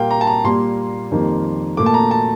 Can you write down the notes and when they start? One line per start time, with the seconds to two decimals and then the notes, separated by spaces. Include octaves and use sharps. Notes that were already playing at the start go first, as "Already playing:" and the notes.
Already playing: A#2 G3 A#3 F5 G5
0.11 A#5
0.21 A5
0.27 A#5
0.44 A#2 G3 A#3 C6
1.11 F2 D#3 G3 A#3
1.77 A#2 A3 D6
1.86 A5
1.94 A#5
2.11 A5